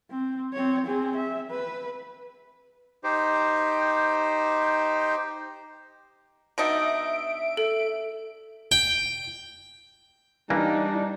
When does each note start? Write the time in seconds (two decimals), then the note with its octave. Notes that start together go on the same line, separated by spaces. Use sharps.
0.10 C4
0.54 C4 C#5
0.86 C4 G#4
1.16 E5
1.51 B4
3.04 D#4 G4 C5
6.58 B2 D4 D#4 E5 D7
7.57 A4
8.72 G5
10.50 E3 G3 A#3 D4 D#4